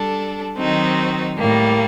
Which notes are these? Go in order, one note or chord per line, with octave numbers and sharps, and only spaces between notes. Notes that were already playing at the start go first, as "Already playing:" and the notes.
Already playing: G3 D4 A4
D#3 F#3 C4 D#4 F#4
A2 G3 A#3